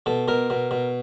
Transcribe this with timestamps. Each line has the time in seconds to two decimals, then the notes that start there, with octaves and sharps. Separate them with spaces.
0.06 B2 A4
0.28 B2 A#4
0.50 B2
0.71 B2